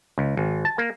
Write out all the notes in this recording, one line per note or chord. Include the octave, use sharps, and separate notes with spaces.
C#2
G#1
A5
A#3